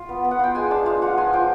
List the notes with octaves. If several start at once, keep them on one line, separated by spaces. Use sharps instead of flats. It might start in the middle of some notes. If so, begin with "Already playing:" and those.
Already playing: F4
B3
B3
F#5
F4 G5
G#3 G#5
D4 A5
F4 F5
F4 F#5
F3 G#5
F3 G5